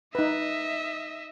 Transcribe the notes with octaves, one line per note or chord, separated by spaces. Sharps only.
D#4 B4 D#5 E5